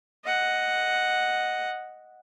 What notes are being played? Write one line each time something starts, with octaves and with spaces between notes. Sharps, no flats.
D#5 F#5